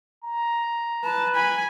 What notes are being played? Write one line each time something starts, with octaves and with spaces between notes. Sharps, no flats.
A#5
B4 A5
G#5 B5